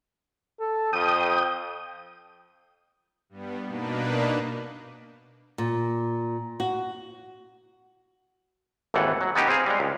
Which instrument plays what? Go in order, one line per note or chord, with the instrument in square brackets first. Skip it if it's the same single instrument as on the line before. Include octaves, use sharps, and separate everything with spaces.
[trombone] A4
[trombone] F2 [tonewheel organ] G5 D#6
[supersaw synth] G2 G3 B3
B2 A#3 D4 D#4 B4
[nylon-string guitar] A#2
F#4
[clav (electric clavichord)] G#1 D#2 E3 A3 F#5
F#3
B3 C#4 D#4 G4
C4 G#4 F5
G3 G#3
C#2